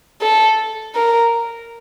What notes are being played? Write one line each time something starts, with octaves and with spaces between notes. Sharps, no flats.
A4
A#4